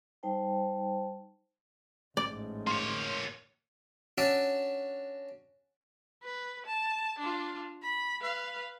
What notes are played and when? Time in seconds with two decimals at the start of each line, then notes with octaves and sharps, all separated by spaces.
0.23 G3 D#4 C5 G5 A5
2.17 A1 G#2 D5
2.67 A#3 C#5 C6
4.18 C#4 D4 F#4 D5 E5 F#5
6.23 B4
6.66 A5
7.19 D4 F4
7.82 B5
8.22 B4 F5